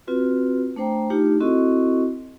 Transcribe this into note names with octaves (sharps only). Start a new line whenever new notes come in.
C4 F4 F#4 B4
A3 D4 C5 G5 A#5
A3 D4 D#4 F4 G4
C4 E4 F#4 A4 D#5 C#6